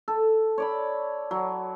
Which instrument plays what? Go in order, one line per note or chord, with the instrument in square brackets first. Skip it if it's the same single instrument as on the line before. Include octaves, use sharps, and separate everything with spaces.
[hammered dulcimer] A4
C#5 D5 B5
F#3